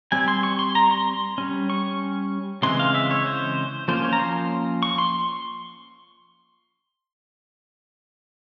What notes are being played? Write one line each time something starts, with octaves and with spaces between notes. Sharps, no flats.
G3 C4 G#5
C6
C#6
C6
A#5
C6
G3 C#4
C#6
C#3 E3 G#3 C4 C6
F5
E5
C#5
C5
F3 A#3 C#4 C5
C#5
A#5
C6
C#6
C6